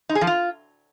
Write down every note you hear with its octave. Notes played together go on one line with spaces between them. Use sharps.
D#4
G#4
F3
F4